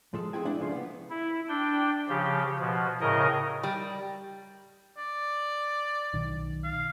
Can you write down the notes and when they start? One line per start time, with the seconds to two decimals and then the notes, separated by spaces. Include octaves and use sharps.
0.14 F3 G#3 A4
0.33 G#3 C4 E4 G#4 G5 G#5
0.45 A3 D4 E4 D5
0.58 C2 C#3 F3 A3 C6
0.72 A#3 B3
1.10 E4
1.49 D4 G5
2.09 C#3 F3 G4
2.60 B2 F3
3.01 A2 C#3 A#4 D#5
3.63 G3
4.98 D5
6.14 B1 D#3
6.64 F5